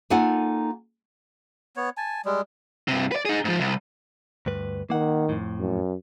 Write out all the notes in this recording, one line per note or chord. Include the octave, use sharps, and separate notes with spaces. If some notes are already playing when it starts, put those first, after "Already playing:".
A#3 D#4 F4 A4 F#5 G#5
B3 C#5
G#5 A5
G3 G#3
G2 C3
B4 D5
D#4 G#4
G#2 F3
C2
D2 G2 B4
D#3 A#3 F#5
F2 A2
F#2